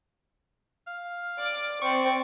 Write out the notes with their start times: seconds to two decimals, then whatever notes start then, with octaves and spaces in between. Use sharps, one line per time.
0.87 F5
1.38 D5 D6
1.82 C4 D5 C#6